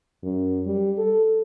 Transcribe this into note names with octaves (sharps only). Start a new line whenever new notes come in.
F#2
G3
A4